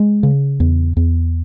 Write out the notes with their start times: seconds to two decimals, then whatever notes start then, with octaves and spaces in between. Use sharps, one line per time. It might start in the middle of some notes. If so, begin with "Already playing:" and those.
Already playing: G#3
0.23 C#3
0.60 E2
0.97 E2